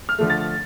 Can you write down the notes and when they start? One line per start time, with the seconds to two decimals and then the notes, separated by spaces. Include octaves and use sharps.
0.09 F6
0.19 D3 F3 A3
0.30 A6